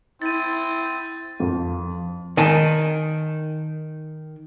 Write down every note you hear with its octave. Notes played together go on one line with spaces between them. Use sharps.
C4 E4 A6 D#7
F2
D#3 G#5 A5